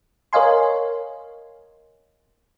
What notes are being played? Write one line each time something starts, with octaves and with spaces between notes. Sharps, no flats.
A#4 C#5 D#5 F5 G#5 C6